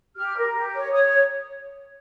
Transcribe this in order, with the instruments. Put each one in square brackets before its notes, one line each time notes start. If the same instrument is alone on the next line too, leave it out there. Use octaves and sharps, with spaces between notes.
[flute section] G4 F6
A#4
G4
C#5
C#5 D#6